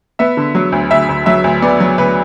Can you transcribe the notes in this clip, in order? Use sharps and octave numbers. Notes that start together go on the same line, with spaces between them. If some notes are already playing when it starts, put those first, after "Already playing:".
B3 E5
D3
F#3
D2
D2 E5
D2
F#3 E5
D2
B3 D5
F#3
D2 B4